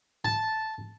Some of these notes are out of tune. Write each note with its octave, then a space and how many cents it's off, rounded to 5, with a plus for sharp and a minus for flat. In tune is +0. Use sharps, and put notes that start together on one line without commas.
A5 -5